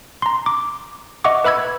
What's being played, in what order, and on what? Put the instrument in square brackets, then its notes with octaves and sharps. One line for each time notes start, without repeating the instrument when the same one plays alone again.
[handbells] A#5 C6
D6
D#5 E5 F#5 C#6 D6
B4 E5 B5 E6 G#6